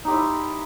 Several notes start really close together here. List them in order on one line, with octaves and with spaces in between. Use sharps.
D#4 G4 C5 E4